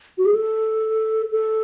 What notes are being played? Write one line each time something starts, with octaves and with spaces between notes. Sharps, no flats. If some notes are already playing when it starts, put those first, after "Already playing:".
F#4
G#4
A4
A4